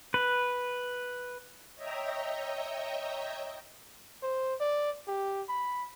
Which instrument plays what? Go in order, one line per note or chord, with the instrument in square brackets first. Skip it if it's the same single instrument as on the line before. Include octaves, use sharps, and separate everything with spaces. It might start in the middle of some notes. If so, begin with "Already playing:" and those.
[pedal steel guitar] B4
[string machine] C#5 D#5 E5 G5 A#5
[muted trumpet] C5
D5
G4
B5